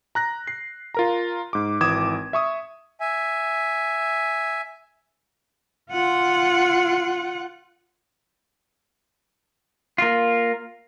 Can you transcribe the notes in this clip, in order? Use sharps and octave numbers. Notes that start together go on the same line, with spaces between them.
A#5 F#6 A#6
C7
F4 A#4 A#5
G#2 D6
G#1 E3 D6 D#6 G#6 E7
E5 C#6 D#6
E5 G#5
F4 F#5
A#3 F4